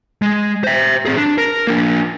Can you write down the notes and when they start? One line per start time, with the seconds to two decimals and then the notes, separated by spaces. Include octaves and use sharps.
0.22 G#3
0.64 C5 E5
1.05 C4 G#4
1.17 D4
1.38 A#4
1.67 A#3 D4